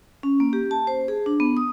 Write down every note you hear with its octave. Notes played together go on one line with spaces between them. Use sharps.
C#4
A#3
G4
A5
C5
G#4
D4
B3
D#6